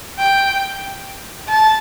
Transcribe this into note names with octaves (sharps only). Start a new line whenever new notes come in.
G5
A5